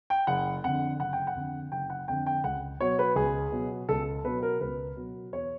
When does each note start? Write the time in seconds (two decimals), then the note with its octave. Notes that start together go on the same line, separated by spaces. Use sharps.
0.10 G5
0.27 F#1 F#5
0.64 F2 D3 F#5
0.99 F#1 F#5
1.13 G5
1.27 F#5
1.35 F2 D3
1.72 F#1 G5
1.90 F#5
2.08 F2 D3 G5
2.26 G5
2.44 C#2 F#5
2.80 B2 F#3 C#5
2.99 B4
3.16 C#2 G#4
3.52 B2 F#3
3.89 C#2 A4
4.24 B2 F#3 B4
4.43 A#4
4.61 C#2 B4
4.96 B2 F#3
5.32 E2 C#5